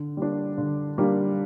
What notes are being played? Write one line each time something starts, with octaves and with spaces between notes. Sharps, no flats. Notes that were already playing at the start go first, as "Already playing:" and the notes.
Already playing: D3
G3 A#3 D4
D3
G3 A#3 D4